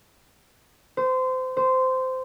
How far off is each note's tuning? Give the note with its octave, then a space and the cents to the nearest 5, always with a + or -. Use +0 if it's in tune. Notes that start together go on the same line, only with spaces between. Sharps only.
C5 -25
C5 -15